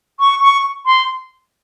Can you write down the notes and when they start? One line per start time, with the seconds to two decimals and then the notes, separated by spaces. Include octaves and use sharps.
0.20 C#6
0.42 C#6
0.86 C6